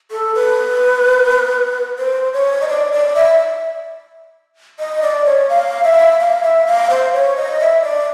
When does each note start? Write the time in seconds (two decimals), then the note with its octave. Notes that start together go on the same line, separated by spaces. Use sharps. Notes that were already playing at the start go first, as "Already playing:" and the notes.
0.11 A4
0.35 B4
1.98 C5
2.34 C#5
2.61 D#5
2.68 D5
2.92 D5
3.15 E5
4.79 D#5
5.03 D5
5.25 C#5
5.50 F5
5.84 E5
6.20 F5
6.43 E5
6.66 F5
6.90 C5
7.13 C#5
7.37 D#5
7.60 E5
7.82 D5